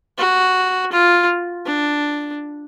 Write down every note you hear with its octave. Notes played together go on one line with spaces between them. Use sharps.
F#4
F4
D4